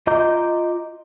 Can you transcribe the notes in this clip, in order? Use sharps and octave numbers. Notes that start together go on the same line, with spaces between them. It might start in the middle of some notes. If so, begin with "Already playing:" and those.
F4 D#5 A#5 D6 G6